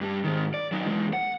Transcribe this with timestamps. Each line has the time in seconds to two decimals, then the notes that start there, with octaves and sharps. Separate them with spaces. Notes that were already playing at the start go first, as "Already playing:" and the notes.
0.01 G2 G3
0.24 G#2 D#3
0.54 D5
0.72 F#3 D#4
0.87 E2 G#3
1.13 F#5